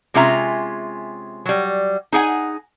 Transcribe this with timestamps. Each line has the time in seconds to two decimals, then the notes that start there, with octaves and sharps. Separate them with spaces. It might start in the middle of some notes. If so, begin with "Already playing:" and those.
0.14 C3 G#3 C#4 F4 E5 A#5
1.46 F#3 G3
2.12 D#4 G#4 F#5 G#5